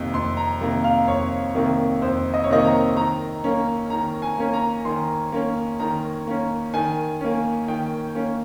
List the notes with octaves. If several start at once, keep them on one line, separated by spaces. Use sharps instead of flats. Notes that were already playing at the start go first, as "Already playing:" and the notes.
Already playing: F2 C3 D#3 A#3
F2 C6
A#5
C3 D#3 A#3
F5
F2 C#5
C3 D#3 A#3
F2 C5
D#5
C#5
C3 D#3 A#3 D#5
A#5
D#3 A#5
A#3 C#4
D#3 A#5
G#5
A#3 C#4
A#5
D#3 C6
A#3 C#4
D#3 A#5
A#3 C#4
D#3 G#5
A#3 C#4
D#3 G5
A#3 C#4